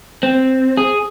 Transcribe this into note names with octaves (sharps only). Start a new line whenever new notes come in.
C4
G#4